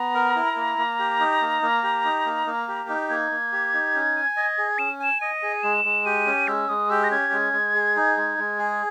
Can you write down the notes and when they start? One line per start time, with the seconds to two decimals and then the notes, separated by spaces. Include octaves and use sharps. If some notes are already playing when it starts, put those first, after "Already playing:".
Already playing: B3 A#5
0.15 A#4
0.36 E4
0.57 A#3
0.78 A#3
0.99 G4
1.20 D#4
1.41 A#3
1.62 A#3
1.83 G4
2.05 D#4
2.26 A#3
2.47 A#3
2.68 G4
2.89 D#4
3.10 A#3 G#6
3.31 A#3
3.52 G4
3.73 D#4
3.94 C#4
4.16 G#5
4.37 D#5
4.58 G#4
4.79 C#4 E7
5.00 G#5 E7
5.21 D#5 D#7
5.42 G#4
5.63 G#3 E7
5.85 G#3
6.06 G4 D#7
6.27 C#4
6.48 G#3 E6
6.69 G#3 D#6
6.90 G4 E6
7.03 A#6
7.11 C#4 G#6
7.32 G#3
7.53 G#3
7.74 G#4
7.96 D#4
8.17 G#3
8.38 G#3
8.59 G#4